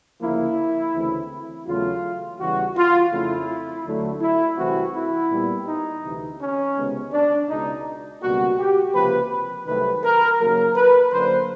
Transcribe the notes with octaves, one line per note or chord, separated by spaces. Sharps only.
D2 C#3 F3 A#3 E4
D2 C#3 E3 A3 C4
E2 C#3 F#3 A3 F4
E2 C#3 E3 G3 F#4
F4
F2 C#3 F3 A3 C4 E4
D2 D3 F#3 A3
E4
C2 C3 E3 A3 C4 F#4
E4
A#2 G3 B3
D#4
D2 C3 E3
C#4
C#2 C3 D#3 G#3 B3
D4
C#2 B2 G#3 D#4
C#2 B2 G3 A#3 F#4
G4
C#2 C3 F3 A#3 B4
C2 C3 D#3 F#3 A3 B4
A#4
D#2 C#3 F#3 A#3 A#4
B4
F#2 D3 F#3 A#3 C5